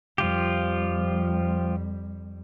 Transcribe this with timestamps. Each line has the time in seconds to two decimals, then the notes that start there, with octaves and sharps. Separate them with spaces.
0.18 F2 F3 G3 F4 G4